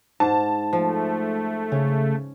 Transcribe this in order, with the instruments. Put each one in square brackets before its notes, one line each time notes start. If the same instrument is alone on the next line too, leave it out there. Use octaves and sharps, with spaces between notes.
[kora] G#2 [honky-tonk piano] A5
[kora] F3 [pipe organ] A3
[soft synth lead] C#3 [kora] C#4